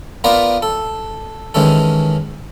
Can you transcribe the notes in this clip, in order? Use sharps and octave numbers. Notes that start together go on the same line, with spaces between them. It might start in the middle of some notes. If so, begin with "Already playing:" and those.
B3 F4 A#4 B4 D5
A4
D#3 E3 G#3 C#4 A4